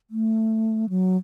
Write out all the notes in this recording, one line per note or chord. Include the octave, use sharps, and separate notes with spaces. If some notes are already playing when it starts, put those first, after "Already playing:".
A3
F#3